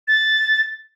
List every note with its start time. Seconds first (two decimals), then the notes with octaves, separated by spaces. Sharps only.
0.08 A6